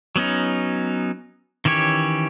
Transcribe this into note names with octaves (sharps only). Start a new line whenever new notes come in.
F#3 B3 C#4 D#4
D#3 E3 C#4 G4 C#5